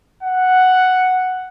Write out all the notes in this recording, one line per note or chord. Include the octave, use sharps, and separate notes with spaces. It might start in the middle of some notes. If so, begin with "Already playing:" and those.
F#5